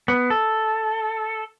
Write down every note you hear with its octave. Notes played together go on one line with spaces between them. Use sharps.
B3
A4